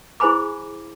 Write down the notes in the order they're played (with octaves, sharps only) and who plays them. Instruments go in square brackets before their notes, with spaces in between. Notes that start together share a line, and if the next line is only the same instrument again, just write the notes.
[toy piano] E4 G#4 C5 G#5 B5 D6